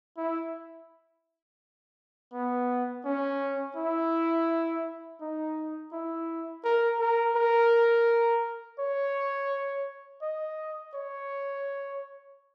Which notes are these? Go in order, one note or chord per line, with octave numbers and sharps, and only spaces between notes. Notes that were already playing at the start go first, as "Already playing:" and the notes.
E4
B3
C#4
E4
D#4
E4
A#4
A#4
A#4
C#5
D#5
C#5